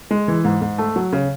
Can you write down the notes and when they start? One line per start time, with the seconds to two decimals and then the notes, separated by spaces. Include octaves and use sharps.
0.11 G#3
0.28 E3
0.45 G#2
0.62 G#2
0.78 A3
0.96 F#3
1.12 C#3